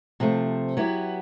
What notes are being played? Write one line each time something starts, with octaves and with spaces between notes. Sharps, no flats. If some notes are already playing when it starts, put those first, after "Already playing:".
C3 F3 A3
F#3 B3 E4 G4